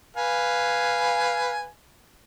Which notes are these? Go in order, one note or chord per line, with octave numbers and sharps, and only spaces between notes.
B4 F5 G#5